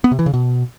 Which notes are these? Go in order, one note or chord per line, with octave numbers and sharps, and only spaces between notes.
B3
C3
E3
C#3
B2